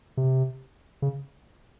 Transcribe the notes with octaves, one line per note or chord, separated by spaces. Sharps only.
C3
C#3